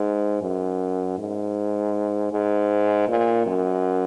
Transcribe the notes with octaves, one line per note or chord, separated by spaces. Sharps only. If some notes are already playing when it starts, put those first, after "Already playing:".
Already playing: G#2
F#2
G#2
G#2
A#2
F#2